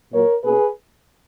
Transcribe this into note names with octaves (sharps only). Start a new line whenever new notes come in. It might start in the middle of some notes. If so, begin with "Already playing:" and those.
A#2 F#3 A#3 A#4 C#5
B2 A#3 C#4 G#4 B4